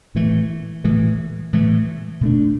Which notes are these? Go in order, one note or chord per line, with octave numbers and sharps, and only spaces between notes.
A2 E3 A3
A2 E3 A3
A2 E3 A3
B2 A3 D4